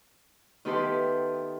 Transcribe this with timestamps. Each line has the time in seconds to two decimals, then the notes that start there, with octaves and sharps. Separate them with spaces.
0.65 D#3 B3 E4 G4 A4 C6